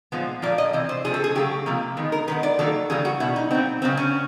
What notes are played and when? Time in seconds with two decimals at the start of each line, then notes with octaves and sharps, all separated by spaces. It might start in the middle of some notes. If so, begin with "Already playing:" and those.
0.12 A#2 F3 G#3 B3
0.42 A#2 F3 A#3 D5
0.58 D#5
0.73 C3 E3
0.89 C5
1.04 C3 F3 A3 G#4
1.14 A4
1.24 G#4
1.35 C#3 F#3 A3 G4
1.66 C3 F3 A#3
1.97 D#3 G#3 B3
2.12 A#4
2.28 D#3 G#3 B3 B4
2.43 D5
2.59 D#3 F#3 A#3 A4
2.90 C#3 E3 G3 A#3 G#4
3.05 F#4
3.20 B2 G3 B3 E4
3.36 D#4
3.51 A#2 G3 B3 C4
3.82 C#3 F#3 B3 C4
3.97 C#4